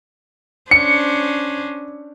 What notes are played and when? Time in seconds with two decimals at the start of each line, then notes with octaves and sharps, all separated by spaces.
0.71 C#4 D4 C5 C#7